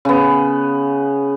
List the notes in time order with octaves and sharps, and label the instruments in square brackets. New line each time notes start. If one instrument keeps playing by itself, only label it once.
[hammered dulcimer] C#3 B3